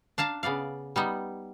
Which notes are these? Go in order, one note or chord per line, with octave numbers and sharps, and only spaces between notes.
D4 F5 A5 A#5
C#3 B3 D5 F5
G3 B3 D#4